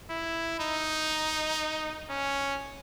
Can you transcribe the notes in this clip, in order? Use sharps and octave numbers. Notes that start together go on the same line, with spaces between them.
E4
D#4
C#4